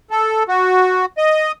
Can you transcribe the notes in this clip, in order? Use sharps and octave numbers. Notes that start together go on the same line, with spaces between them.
A4
F#4
D#5